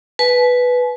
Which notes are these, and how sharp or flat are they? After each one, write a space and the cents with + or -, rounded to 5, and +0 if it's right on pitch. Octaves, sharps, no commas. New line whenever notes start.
B4 +0 G#5 +45